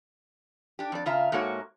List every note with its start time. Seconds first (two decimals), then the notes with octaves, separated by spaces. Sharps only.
0.79 D4 G4
0.92 F2 D5
1.06 C#3 F4 E5 A#5
1.32 G#2 A#3 F#4 A4 C#5